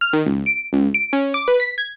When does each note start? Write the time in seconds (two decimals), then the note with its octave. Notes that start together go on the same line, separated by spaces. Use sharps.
0.01 F6
0.13 D#3
0.26 C#2
0.46 D7
0.73 C#2
0.94 D7
1.13 C#4
1.34 D6
1.48 B4
1.60 B6
1.78 G#6